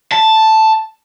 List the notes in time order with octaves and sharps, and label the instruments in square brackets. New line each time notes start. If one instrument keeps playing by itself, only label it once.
[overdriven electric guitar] A5